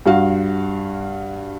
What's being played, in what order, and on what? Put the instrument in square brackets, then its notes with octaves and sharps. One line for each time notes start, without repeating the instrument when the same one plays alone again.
[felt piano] G2 F#4 F5